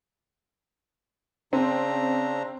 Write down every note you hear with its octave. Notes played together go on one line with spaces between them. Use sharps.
C#3 C4 D4 A#5